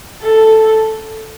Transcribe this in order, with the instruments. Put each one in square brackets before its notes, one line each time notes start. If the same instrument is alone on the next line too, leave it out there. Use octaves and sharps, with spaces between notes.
[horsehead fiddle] A4